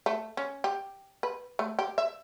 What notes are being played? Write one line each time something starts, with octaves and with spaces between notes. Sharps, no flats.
A3
C#4
G4
B4
A3
G4
E5